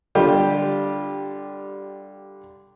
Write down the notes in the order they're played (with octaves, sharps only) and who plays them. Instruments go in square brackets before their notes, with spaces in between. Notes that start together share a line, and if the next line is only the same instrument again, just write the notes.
[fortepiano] D3 G3 F4 G4